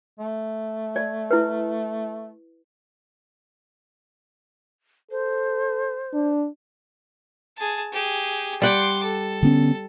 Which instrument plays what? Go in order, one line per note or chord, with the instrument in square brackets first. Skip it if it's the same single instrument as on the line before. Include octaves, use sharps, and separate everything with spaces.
[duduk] A3
[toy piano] D5
E4 B4
[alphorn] A4 [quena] C5
[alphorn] D4
[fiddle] G#4 A5
G4 G#4
[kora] G3 F#5 G5 [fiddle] C6 D6
[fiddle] A4
[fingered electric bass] D3 B3 C#4